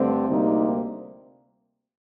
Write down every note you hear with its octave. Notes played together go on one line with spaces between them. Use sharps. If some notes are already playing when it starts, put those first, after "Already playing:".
Already playing: G2 D3 A3 C4
D2 C3 G3 A#3 D#4